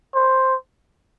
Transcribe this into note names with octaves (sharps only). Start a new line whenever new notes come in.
C5